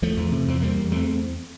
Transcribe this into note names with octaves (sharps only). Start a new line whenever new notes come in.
E2 F3 A3
E2
C3
E2 C4
E2 G3 A#3
E2
E2 A3 C4